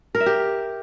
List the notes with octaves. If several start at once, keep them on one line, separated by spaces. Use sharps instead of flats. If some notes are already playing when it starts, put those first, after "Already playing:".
A#4
E5
G4